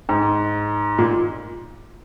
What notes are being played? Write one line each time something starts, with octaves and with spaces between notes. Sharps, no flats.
G#2
A#2